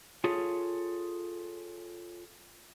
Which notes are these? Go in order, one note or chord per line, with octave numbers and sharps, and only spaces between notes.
F4 G#4 A4 C#5